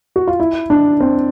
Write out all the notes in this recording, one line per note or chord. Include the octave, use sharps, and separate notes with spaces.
F#4
F4
E4
D4
C4